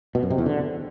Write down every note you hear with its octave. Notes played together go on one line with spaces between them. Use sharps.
B2
F#2
C3
E2
D3